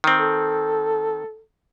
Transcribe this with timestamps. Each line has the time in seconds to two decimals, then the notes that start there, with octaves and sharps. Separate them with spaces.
0.04 D#3 C4
0.18 A4